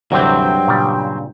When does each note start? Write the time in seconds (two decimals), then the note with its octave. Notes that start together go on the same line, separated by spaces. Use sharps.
0.12 D2 G2 C3 E3 F#3 C4 G5
0.68 A#2 C#3 G3